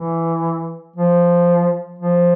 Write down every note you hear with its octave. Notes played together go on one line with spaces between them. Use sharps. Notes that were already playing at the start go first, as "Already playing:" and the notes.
Already playing: E3
F3
F3